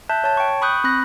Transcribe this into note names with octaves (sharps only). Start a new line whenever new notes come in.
E5 A5 F#6 G6
C#5 A5
G5 C#6
B5 C#6 D#6 F#6 G6
C4 B5 F#6 A#6